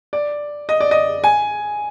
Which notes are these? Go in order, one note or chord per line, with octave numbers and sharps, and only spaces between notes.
D5
D#5
D5
D#5
G#5